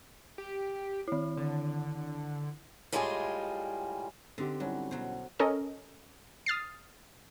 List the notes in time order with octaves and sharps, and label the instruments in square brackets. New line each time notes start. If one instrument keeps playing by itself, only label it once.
[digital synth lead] G4
[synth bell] D#3 E4
[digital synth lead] D3
[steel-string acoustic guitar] A2 G3 G#3 E4 F4 G#4
[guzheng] D3 [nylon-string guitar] C4 D#4 G4
[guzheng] F#3 [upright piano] G3 C#4 E4
[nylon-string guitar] B2 [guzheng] F#3 C5
[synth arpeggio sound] C#4 A4 A#4 D#5
D#6 F6 A6 C7